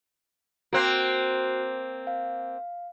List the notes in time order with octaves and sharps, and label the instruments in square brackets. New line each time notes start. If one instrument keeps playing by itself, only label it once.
[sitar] A#3 C4 [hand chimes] F#4 F#6 C7
[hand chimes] F5